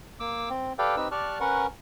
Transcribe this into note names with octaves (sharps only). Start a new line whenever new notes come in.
A#3 D6 E6
C4
G4 A4 B4 D5 F5 G5
C4 D#4 G4 B4 E6
G4 D5 A5 C#6 F6 F#6
C#4 A#4 B4 F#5 C#6